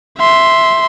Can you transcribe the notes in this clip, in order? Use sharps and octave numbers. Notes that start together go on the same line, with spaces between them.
E5 C6